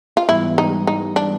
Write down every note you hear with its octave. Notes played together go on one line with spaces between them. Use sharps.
F4
G#2 E3 G3 B3 E4
D#4
D#4
D4